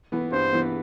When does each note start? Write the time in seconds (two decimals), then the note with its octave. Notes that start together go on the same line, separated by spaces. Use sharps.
0.12 E3 B3
0.32 G2 C5
0.53 E3 B3